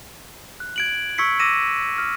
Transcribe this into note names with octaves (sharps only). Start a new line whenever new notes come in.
F#6
G#6 D7 F#7
C#6 E6 G#6 B6 C#7
D6 E6 G#6 A#6 D#7 E7
F6